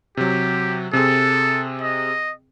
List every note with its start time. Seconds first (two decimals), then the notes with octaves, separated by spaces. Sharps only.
0.17 C3 F#3 G4
0.93 C3 C4 G#4 A4
1.82 D#5